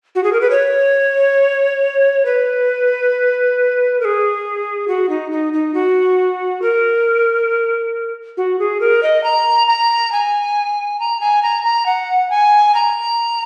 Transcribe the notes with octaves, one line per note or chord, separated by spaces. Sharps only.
F#4
G#4
A#4
B4
C#5
B4
A#4
G#4
F#4
D#4
D#4
D#4
F#4
A#4
F#4
G#4
A#4
D#5
A#5
A#5
G#5
A#5
G#5
A#5
A#5
F#5
G#5
A#5